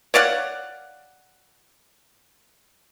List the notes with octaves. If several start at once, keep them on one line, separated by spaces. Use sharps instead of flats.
C#5 D5 F5 F#5